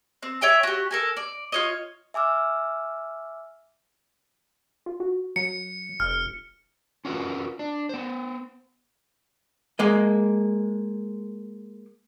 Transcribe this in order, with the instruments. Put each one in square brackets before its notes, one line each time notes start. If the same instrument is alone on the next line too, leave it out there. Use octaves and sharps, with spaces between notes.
[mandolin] C4
C#5 E5 G5 G#5
F#4 G4
A4 A#4 G#5
D5
F4 C#5 D#5
[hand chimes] E5 G#5 D6 E6 F6
[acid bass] F4
F#4
[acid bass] F#3 [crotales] C#7
[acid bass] F1 [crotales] F6
[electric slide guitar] C#4 F4 F#4 A#4 B4
D4
B3 C5
[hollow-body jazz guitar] G#3 A#3 D#5